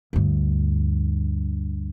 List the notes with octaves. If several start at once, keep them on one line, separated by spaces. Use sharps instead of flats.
D2 G2